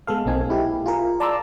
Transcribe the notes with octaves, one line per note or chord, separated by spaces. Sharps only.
G#3 B3 A4 F5
B1 A#3 C4 D#4 G#5
E4 G4
F4 G#4 A#4
D5 A5 A#5 C6 D6 E6